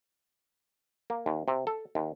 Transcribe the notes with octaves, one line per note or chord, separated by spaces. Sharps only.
A#3
D#2
C3
A4
D#2